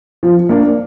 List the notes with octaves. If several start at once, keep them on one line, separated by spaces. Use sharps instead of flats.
F3
A#3 D4